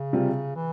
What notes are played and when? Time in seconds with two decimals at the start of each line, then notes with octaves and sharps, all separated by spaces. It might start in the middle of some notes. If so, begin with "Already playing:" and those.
Already playing: C#3
0.13 C3 G3 C4 F4
0.56 E3